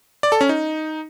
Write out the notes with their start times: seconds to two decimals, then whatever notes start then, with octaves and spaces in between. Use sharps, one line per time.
0.23 D5
0.32 A4
0.41 C#4
0.49 D#4